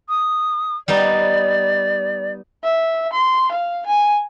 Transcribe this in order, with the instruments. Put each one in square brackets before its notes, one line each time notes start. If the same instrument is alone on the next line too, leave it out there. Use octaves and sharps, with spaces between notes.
[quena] D#6
[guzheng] G3 B3 D#4 [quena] D5
[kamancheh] E5
C6
F5
G#5